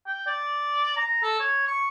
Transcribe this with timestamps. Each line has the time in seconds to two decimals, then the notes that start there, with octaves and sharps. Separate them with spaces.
0.06 G5
0.27 D5
0.96 A#5
1.23 A4
1.40 C#5
1.68 C#6